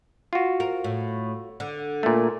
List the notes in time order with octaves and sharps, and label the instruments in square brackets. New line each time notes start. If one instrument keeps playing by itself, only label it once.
[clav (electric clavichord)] F4 F#4
[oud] A#4
A2
D3
[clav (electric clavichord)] A#2 A3